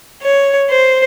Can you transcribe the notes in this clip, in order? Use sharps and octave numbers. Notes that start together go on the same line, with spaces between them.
C#5
C5